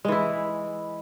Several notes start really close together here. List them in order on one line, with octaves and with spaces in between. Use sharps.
G#3 E3 E4